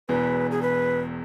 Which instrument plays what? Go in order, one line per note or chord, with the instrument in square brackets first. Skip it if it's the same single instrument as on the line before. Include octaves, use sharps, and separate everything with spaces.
[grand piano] E1 E2 B2 [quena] B4
[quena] G#4
B4